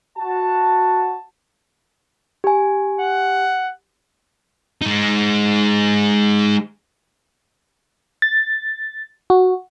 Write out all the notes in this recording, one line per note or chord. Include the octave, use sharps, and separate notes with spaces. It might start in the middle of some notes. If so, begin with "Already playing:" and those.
F#4 A5
G4 G#5
F#5
G#3 D#4
A6
F#4